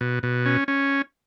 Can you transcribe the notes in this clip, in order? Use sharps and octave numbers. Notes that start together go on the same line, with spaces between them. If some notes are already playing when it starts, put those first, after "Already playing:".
B2
B2
C#4
C#4